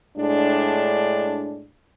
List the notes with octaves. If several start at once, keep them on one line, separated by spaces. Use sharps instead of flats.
A2 G#3 D4